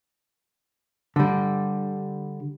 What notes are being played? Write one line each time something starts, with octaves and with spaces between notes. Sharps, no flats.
D3 G3